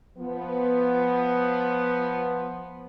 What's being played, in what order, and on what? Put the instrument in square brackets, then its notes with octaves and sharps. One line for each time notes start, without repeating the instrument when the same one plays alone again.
[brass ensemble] F3 B3